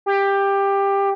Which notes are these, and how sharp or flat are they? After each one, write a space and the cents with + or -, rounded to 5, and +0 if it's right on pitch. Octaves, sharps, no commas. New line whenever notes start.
G4 +15